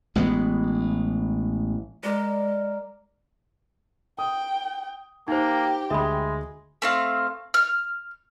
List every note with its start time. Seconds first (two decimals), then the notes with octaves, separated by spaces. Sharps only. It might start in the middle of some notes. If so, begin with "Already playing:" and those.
0.15 A1 E3 G#3 B3
2.03 G#3 A#4 D5
4.19 G5 D#6
5.28 A#3 D#4 G4 C5 G5
5.90 D2 G#3 G#4 E5 B5 D#6
6.82 A3 C4 F5
7.54 F6